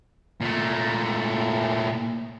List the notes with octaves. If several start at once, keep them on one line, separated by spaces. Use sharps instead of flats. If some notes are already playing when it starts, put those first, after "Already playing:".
A#2 A3